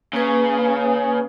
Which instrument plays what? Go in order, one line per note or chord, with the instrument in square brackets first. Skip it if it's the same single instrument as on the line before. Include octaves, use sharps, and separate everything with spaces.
[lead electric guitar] C#3 [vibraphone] A#3 B4